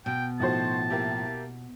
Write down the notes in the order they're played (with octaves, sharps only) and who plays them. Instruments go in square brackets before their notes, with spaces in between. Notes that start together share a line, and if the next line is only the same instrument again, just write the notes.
[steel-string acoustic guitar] B2 [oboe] G5
[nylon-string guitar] A2 F3 [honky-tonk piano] D#3 F#4 C5 [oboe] A5
[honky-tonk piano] A#3 E4 G4